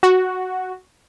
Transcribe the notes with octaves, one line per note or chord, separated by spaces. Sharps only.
F#4